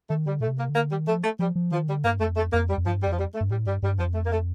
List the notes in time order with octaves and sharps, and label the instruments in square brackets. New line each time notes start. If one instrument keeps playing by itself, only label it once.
[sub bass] D#3 [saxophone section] A3
[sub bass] D3 [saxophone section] G3
[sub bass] A#2 [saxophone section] A3
[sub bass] C3
[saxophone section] A#3
[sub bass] D3
[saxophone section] A#3
[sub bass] D#3 [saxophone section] G3
[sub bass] F3 [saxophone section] A3
[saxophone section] A3
[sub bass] F3 [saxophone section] G3
[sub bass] F3
[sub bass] D#3 [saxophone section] F3
[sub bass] D3 [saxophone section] G3
[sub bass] G2 [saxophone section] A#3
[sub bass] F2 [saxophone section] A3
[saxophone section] A3
[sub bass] F2 [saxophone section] A#3
[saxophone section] G3
[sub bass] F2
[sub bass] G2 [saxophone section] F3
[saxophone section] G3
[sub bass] F2 [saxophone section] F3
[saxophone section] G3
A3
[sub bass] G2
[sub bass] A2 [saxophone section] G3
[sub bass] G2 [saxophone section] G3
[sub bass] G2 [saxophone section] G3
[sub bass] F2 [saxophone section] F3
[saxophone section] A3
A#3
A3